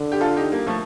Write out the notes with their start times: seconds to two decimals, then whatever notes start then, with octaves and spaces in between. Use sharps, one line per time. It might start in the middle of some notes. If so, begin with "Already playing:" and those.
Already playing: D3
0.12 G4
0.21 F4 A4
0.36 D#4 G4
0.52 G3 A#3
0.67 F3 A3